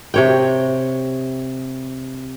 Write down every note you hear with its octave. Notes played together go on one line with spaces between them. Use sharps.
C3 C#5 G5